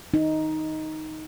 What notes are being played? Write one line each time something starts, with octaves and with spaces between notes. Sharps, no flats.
D#4